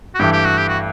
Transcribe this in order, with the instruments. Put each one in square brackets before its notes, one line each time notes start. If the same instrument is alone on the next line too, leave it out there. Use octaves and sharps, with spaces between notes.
[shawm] F#4
[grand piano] G2 E3 A3 [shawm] G4
[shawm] G4
F#4
G4
F#4